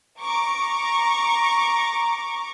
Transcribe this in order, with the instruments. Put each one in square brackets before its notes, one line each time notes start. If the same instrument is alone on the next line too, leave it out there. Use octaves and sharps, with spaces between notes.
[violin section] A#5 C#6 D6